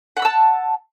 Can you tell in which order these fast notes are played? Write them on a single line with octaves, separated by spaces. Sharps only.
F#5 B5 E6 A5